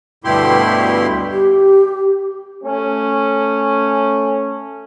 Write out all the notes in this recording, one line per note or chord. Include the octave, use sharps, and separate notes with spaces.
D2 G2 B2 E4 G4 C6
G4
A3 C#4